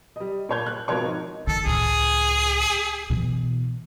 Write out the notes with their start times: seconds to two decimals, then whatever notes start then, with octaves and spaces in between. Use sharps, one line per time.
0.16 G3 D#5
0.49 A#2 C#5 G6
0.66 F#6
0.88 G#1 B2 F3 A#4 C#5 C#6
1.05 D#4
1.47 D#3 A4
1.65 C#2 A2 G#4
3.10 B2 E3